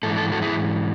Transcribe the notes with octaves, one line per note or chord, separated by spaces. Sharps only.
G#2 E3 A4
A4
F#4 A4
E4 G#4